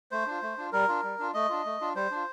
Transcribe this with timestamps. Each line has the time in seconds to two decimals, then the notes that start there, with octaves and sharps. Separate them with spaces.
0.11 A3 C5
0.26 D4 F4
0.42 A3
0.58 D4 F4
0.72 G3 A#4
0.88 D4 F4
1.03 G3
1.19 D4 F4
1.34 A3 D#5
1.49 D4 F4
1.65 A3
1.81 D4 F4
1.95 G3 C5
2.11 D4 F4